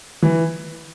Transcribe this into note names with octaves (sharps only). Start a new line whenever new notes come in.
E3